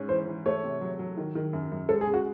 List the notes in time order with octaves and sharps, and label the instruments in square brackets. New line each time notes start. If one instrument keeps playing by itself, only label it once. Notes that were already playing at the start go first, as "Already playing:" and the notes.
Already playing: [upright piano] G#2 C#4
[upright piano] E3 [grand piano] C5
[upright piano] E3
[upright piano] A3 [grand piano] C#5
[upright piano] C3
F#3
F#3
D#3
D#3
F#2
F#2
[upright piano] G#3 [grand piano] A4
[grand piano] G#4
[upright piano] C#3
[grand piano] F#4